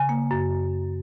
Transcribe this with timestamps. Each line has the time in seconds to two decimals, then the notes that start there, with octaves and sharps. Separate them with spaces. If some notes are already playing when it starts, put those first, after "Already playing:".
Already playing: C#3 G#5
0.09 A#3
0.31 F#2